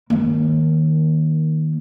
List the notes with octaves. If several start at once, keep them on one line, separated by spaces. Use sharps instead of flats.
D#3 A#3